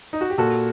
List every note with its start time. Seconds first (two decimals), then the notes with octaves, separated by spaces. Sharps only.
0.13 D#4
0.21 F#4
0.30 G4
0.38 A#2 F#4 A4